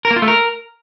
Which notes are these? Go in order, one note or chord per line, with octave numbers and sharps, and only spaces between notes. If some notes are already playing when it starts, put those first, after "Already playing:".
A#4
A#3
F4
A3
A#4